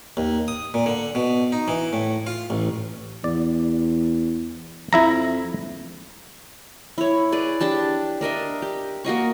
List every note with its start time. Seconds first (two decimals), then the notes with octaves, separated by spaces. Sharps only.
0.17 D#2
0.48 D#6
0.74 A#2
0.86 D3
1.15 B2
1.52 D#4
1.68 E3
1.93 A2
2.27 F4
2.50 A1
3.24 E2 D5
4.93 F2 E4 E5 A#5
6.98 E4 C#5
7.32 G#4 B4 D5
7.60 D4 G4 A5
8.21 D4 A#4 D#5 E5
8.62 G4
9.05 A#3 F#4 D#5 C#6